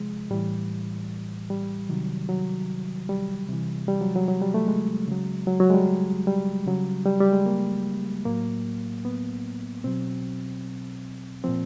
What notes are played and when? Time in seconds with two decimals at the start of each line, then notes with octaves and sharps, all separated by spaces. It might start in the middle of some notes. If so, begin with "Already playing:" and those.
Already playing: C3 F3 G#3
0.31 A2 E3 G3
1.50 G3
1.89 C3 D#3 F#3
2.29 F#3
3.09 G3
3.49 C3 E3
3.88 G3
4.01 F#3
4.16 F#3
4.28 F#3
4.42 G3
4.54 A3
4.68 G#3
5.08 C#3 F#3
5.47 F#3
5.60 F#3
5.70 G#3
5.74 G3
6.27 G3
6.66 C#3 F#3
7.06 G3
7.20 G3
7.33 G#3
7.46 A#3
8.26 A2 F#3 A#3
9.05 B3
9.84 B2 F#3 C4
11.44 A#2 F3 C4